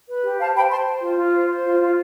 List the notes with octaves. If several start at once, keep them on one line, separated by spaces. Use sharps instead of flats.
B4
G4
C5 F5 A5
C5 G5 B5
C5 A5 C6
C5
F4
F4
C5
C5
F4
F4